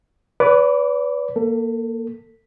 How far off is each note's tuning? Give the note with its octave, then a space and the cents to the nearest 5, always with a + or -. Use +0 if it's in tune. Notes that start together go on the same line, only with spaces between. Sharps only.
B4 +5 D5 -45 D6 -15
A#3 +0 A4 +30